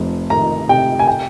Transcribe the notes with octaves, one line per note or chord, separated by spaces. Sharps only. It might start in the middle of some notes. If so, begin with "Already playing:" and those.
Already playing: F1 F2
D#3 A#5
C3 G5
G#5
G5